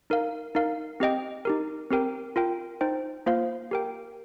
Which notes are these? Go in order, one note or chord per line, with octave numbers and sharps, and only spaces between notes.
D#4 A#4 F5
D#4 A#4 F5
C4 G4 D#5 G5
D#4 G4 A#4
C4 G4 A#4 G5
F4 A#4 G5
D#4 C5 G5
A#3 F4 C5 F5
G4 A#4 G5